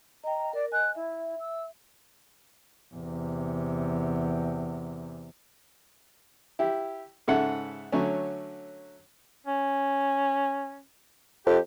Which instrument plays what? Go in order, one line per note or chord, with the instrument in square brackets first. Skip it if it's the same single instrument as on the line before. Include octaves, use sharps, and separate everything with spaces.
[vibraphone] D#5 G5 [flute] A#5
[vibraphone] A#4 [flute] D5
[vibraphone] D#5 G#5 [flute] F#6
[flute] E4 [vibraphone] E5
[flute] E6
[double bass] E2 C3
[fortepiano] E4 G4
G#2 C#3 A4 E5 F#5
D3 F#3 A3 C#4
[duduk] C#4
[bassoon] F2 [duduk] G4